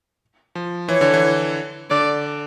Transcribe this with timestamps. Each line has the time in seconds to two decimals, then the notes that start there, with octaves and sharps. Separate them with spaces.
0.55 F3
0.89 E3 C#5
1.01 D3
1.14 E3
1.90 D3 D5